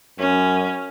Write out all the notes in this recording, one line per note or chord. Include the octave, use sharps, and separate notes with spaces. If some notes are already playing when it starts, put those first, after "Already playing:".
F#2 C#4